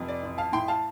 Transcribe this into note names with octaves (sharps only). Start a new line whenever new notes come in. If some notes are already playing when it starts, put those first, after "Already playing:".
Already playing: F1 F2
D5
A1
F5 A5
A2 G5 C6
F5 A5